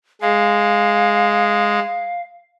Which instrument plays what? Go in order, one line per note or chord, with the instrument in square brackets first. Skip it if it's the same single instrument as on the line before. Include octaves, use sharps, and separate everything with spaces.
[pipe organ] G#3 [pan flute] F5